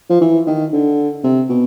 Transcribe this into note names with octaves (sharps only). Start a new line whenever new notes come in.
F3
E3
D#3
D3
C3
B2